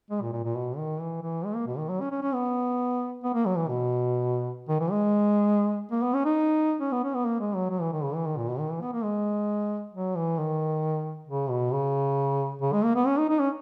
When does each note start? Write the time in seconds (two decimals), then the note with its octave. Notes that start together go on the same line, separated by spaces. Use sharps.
0.10 G#3
0.22 A#2
0.33 A#2
0.44 A#2
0.55 B2
0.77 D#3
1.00 E3
1.22 E3
1.45 G#3
1.55 A#3
1.67 B2
1.78 D#3
1.89 F#3
2.00 C#4
2.11 C#4
2.22 C#4
2.34 B3
3.23 B3
3.34 A#3
3.46 F#3
3.56 E3
3.68 B2
4.68 D#3
4.80 E3
4.91 G#3
5.91 A#3
6.02 B3
6.14 C#4
6.25 D#4
6.81 C#4
6.92 B3
7.04 C#4
7.14 B3
7.25 A#3
7.40 G#3
7.55 F#3
7.70 F#3
7.81 E3
7.92 D#3
8.03 C#3
8.15 E3
8.26 D#3
8.37 A#2
8.48 B2
8.59 D#3
8.71 E3
8.82 B3
8.93 A#3
9.04 G#3
9.94 F#3
10.16 E3
10.38 D#3
11.27 C#3
11.49 B2
11.73 C#3
12.61 C#3
12.73 G#3
12.84 A#3
12.95 B3
13.06 C#4
13.18 D#4
13.29 D#4
13.40 C#4